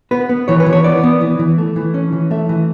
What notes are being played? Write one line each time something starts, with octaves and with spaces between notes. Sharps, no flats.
B3 B4
B3
E3 C#5
B4
E3
C#5
B3 D5
B3
E3
E3
A3
E3
C#4
E3
A3 E5
E3